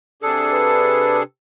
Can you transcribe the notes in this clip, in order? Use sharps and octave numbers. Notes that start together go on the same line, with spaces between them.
C3 D4 G#4 A4
B4